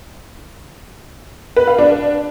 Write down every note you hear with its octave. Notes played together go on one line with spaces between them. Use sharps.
B4
F5
D4